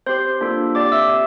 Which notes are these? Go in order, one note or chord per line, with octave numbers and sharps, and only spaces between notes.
C4 G4 C5 C6
A#3 D4 F4 A4
C4 G4 D5 D6
E5 E6
G4